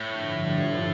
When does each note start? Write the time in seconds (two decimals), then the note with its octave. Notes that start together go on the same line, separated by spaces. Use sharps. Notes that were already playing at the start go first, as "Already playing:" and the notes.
Already playing: A2
0.09 G2 D3 F3